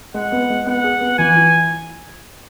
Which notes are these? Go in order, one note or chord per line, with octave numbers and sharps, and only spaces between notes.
G#3 F#5
B3
G#3
B3 F#5
G#4
B3
E3 G#5
E4